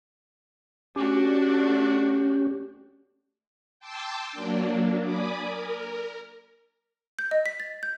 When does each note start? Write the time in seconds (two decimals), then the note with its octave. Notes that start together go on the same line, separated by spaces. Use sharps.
0.96 A3 C#4 D4 F#4 G4
3.80 G5 A5 C6 D6 E6
4.32 F#3 A#3 D4
5.02 D5 G#5 B5 D6 D#6
5.40 A#4
7.19 G6
7.31 D#5
7.46 B6
7.60 A6
7.83 G6